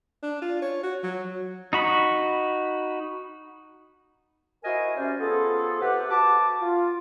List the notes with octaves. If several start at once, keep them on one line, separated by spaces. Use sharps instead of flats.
D4
F4
C#5
F#4
F#3
D#4 F#4 B5
E4 F#4 A#4 C5 D#5 G#5
C3 C#4 C5 D5
F3 B3 F4 G#4 A4
C3 G4 B4 F#5
F#4 A5 D6
F4